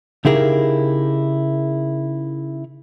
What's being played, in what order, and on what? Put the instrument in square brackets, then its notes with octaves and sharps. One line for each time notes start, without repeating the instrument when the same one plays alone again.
[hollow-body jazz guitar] C#3 D#4 E4 G4 G#4 A#4